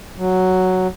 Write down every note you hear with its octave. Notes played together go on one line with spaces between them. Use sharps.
F#3